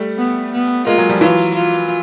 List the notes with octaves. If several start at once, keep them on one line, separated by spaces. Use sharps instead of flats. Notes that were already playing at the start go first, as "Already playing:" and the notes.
Already playing: G3 A3
B3
B3
G#3 A#3 F4
F#3 G#3
F3 G3
E3 F#3 F4
F4